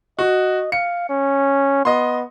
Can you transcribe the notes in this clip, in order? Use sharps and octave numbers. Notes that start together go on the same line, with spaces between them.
F#4 D#5
F5 C#7
C#4
B3 D#5 C6